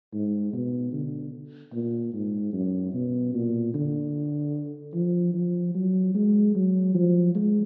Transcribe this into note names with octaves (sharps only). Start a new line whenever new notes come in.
G#2
B2
D3
A#2
G#2
F#2
B2
A#2
D3
F3
F3
F#3
G#3
F#3
F3
G#3